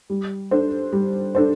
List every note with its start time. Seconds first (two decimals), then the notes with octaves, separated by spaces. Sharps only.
0.10 G3
0.51 D4 A4 C5
0.92 G3
1.35 D4 A4 C5